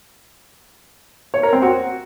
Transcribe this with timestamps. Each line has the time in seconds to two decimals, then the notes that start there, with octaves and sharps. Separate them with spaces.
1.34 C#5
1.43 A#4
1.53 C4
1.62 F#4